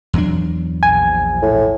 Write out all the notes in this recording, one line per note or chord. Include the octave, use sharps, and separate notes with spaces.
E2 F#3 D4
A#1 G#5
A2